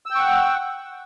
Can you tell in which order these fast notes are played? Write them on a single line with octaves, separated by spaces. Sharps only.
E6 G5 C#6 F#5